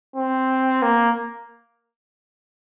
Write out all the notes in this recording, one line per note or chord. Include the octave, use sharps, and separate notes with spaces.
C4
A#3